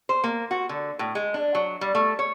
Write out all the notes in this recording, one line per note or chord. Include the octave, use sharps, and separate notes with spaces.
C5
A#3
F#4
D3
A2
G#3
D4
F#3
G3
A3
C#5